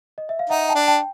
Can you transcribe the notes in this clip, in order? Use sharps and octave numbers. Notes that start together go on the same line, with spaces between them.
D#5
E5
F5
D#4 E5 F#5
G5 A5
D4
G5 A5